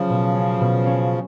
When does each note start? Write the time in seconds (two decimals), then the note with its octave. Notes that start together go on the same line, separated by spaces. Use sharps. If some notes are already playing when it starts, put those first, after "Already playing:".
Already playing: C#3 F3 F#3
0.10 B2
0.35 C#4
0.61 B2
0.86 C#4